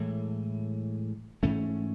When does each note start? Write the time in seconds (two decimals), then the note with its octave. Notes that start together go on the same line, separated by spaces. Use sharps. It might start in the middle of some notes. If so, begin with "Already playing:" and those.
Already playing: A2 E3 G#3
1.43 G#2 E3 A3 C#4